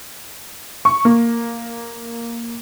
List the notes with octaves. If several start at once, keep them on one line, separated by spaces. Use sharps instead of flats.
C#6
A#3